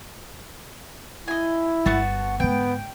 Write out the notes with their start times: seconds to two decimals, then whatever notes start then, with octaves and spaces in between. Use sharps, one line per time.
1.28 E4 D#5 G#5
1.86 G1 B3 F#4 A5
2.40 G#2 D3 B3 G5